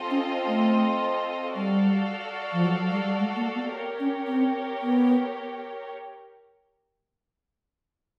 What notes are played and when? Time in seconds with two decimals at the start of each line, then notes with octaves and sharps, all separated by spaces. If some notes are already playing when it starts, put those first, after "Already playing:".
Already playing: C4 F4 A4 C5 D#5
0.11 C#4
0.47 A3
1.56 G3 F#4 A4 D5 F5
2.53 F3
2.65 F#3
2.91 G3
3.19 G#3
3.36 A#3
3.55 B3
3.73 G4 A#4 C#5
4.00 C#4
4.28 C4
4.82 B3